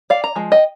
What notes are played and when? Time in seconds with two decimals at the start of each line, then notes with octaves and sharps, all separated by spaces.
0.10 D5 F5
0.24 A#5
0.36 F3 G#3
0.52 D#5 G5